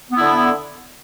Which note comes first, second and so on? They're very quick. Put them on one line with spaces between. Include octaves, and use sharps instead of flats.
B3 E4 D3